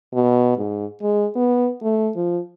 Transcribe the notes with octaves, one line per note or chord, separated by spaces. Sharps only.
B2
G#2
G#3
B3
A3
F3